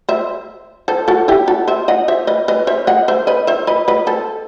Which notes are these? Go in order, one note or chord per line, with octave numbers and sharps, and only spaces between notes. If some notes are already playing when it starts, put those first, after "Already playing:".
C5 E5
A4 C5
F#4 A4
E4 G4
F#4 A4
C5 E5
D#5 F#5
C5 E5
B4 D#5
B4 D#5
C5 E5
D#5 F#5
C5 E5
B4 D#5
C5 E5
B4 D#5
B4 D#5
A4 C5